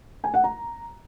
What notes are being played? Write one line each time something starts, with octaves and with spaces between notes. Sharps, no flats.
G#5
F#5
A#5